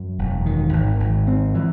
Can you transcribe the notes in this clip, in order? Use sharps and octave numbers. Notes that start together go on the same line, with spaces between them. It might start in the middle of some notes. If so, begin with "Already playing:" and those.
Already playing: F#2
E1
D#3
G#1
G#1
C4
E3